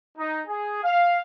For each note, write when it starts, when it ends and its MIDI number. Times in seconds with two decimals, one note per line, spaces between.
0.17 0.40 63
0.47 0.81 68
0.83 1.21 77